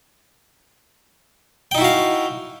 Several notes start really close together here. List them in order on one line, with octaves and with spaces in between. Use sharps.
G5 D#4 E4 F#4 F5